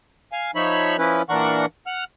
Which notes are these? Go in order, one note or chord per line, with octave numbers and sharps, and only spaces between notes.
F5 G#5
F3 D#4 C#5 E5 B5
F3 C#4 E4 B4
A#2 E3 D4 A#4 F#5 C#6
F#5 F6